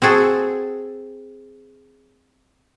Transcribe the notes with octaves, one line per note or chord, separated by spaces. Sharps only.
C4 F#4 G#4 A4